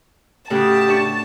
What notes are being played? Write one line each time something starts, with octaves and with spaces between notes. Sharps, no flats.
A2 C#3 F#4 G4 G5 A5 D#6
D4 C#6